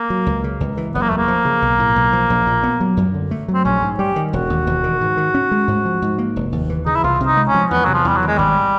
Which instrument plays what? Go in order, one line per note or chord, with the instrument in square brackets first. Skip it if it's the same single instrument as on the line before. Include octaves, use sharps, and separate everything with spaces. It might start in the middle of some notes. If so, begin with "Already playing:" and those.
Already playing: [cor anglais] A#3
[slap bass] F#3
C#2
C#3
C#2
E3
[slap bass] F#1 [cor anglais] B3
[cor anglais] A#3
[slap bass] E2 [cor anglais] A3
[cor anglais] A#3
[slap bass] F3
C#3
B1
A2
B1
F3
A#1
A#2
B3
F#3
F#2
D3
A3
F#3
[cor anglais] C4
[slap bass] A#1 [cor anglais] C#4
[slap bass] G#2
[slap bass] G3 [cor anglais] G4
[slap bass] D#3
[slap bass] E1 [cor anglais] F#4
[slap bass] D#2
E1
D#3
G#2
D#3
C#4
G#3
G#2
F3
G#2
A#3
F1
D#2
E3
[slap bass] C#3 [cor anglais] D#4
[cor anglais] E4
[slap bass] C2 [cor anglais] F4
[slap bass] C3
[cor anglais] D#4
[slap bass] G#3
[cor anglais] C#4
[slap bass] F3
[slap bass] E2 [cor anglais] B3
[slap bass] C3 [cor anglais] F#3
[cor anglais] F3
[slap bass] E2 [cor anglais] G3
[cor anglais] F#3
[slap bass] D#3
[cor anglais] G#3
[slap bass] G#1 [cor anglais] G3